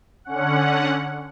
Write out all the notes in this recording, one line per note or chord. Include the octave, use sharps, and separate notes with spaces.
D3 C#4 F#5